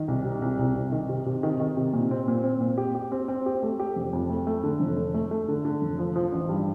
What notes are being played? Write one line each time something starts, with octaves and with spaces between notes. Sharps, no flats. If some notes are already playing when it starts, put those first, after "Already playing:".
Already playing: D#3
C2
C3
C2
C2
C2
D#3
C3
C3
D#3
D#3
C3
A#2
C4
A#2
C4
A#2
G4
G4
C4
C4
G4
A3
G4
F1
F2
A3
A3
D3
F1
A3
A3
A3
D3
D3
F1
F3
F3
A1
G2